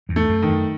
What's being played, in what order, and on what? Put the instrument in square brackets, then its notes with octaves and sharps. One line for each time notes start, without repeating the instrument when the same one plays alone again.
[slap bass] E2 G#2
[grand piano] A3
[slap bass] F#2
[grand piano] D#3
[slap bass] F#2